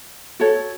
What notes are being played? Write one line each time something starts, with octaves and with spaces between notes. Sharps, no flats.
F#4 A4 C#5